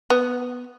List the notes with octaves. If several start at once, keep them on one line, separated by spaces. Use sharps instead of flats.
B3